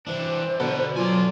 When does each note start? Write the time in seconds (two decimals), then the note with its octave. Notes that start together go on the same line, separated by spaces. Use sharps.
0.07 E3 D4 C5
0.60 B2 D3 A4 B4
0.96 F#3 F4 D5 G#5